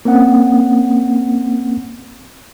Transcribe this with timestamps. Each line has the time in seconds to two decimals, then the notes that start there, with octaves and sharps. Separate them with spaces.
0.05 A#3 C4 C#4 F#5